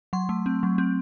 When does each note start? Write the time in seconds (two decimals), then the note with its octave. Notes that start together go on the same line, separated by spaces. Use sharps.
0.13 F#3 C6
0.29 A3
0.46 C4
0.63 F#3
0.78 C4